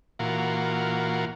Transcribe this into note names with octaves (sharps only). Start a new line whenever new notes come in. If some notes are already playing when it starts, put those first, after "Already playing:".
A#2 E3 F4 F#4 A#4